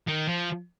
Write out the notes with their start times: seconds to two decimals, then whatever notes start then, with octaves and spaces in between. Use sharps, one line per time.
0.07 D#3
0.28 F3